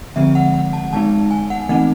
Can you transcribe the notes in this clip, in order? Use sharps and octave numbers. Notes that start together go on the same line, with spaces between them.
D3 F3 G#3 C4 E5
F#5
F#5
A5
D#3 G#3 B3 D#4 A5
G#5
F#5
E3 A3 C4 D#4 F#5